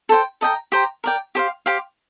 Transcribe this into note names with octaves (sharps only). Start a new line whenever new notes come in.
A4 C5 G5
A4 D#5 G5 A#5
G4 C5 G5 A#5
A#4 D5 G5
G4 C5 F5
G4 C5 F5